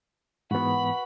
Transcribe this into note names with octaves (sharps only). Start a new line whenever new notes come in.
G#2 E3 B3 F#4 B4 B5